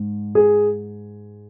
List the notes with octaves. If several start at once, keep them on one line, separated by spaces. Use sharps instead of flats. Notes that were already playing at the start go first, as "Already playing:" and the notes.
Already playing: G#2
G#4